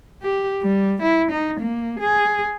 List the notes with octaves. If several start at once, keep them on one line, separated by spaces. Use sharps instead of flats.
G4
G3
E4
D#4
A#3
G#4